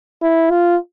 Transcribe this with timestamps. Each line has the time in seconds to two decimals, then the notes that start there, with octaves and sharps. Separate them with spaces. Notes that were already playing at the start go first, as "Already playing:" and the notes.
0.22 E4
0.50 F4